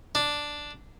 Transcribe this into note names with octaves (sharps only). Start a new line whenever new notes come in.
D4